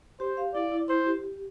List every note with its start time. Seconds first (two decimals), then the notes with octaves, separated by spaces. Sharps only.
0.20 G4 C5
0.37 F5
0.55 E4 D5
0.72 E4
0.89 E4 C5
1.06 G4
1.24 G4